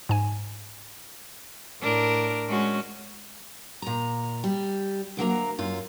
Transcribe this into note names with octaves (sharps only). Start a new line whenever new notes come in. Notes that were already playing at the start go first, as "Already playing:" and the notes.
G#2 G#5
A2 D4 A#4
G#3 C#4 F#4
A#2 A#5
G3
D2 F#3 A#3 A#5
F#2 F4